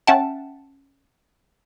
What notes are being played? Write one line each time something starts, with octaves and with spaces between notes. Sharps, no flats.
C#4 E5 F#5 G5 A5